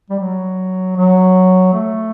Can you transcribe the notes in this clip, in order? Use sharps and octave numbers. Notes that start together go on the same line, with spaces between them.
G3
F#3
F#3
A3